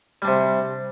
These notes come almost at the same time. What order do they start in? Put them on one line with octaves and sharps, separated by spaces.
G3 D4 C3